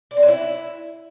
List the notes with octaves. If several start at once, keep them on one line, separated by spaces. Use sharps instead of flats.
D4
C4
F#3
E4